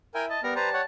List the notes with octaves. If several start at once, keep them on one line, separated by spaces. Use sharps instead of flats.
E4 A#4 G5 G#5
D#5 A5
G3 B3 A#4
B4 C5 A5 A#5
C#5 F#5